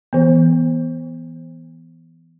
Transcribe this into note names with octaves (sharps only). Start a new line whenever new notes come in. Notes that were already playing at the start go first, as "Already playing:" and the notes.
E3 B3